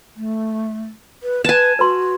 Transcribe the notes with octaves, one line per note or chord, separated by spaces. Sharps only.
A3
B4
B4 G#5 A5
F#4 B4 C6